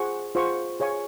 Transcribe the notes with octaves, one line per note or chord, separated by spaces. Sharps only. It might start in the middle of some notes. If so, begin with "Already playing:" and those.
Already playing: F4 G#4 C5 F#5 C#6
F4 G#4 C5 F#5 C#6
G#4 C#5 F5 G#5 C#6